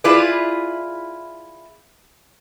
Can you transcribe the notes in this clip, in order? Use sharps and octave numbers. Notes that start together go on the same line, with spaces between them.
E4 F4 G#4 B4 D5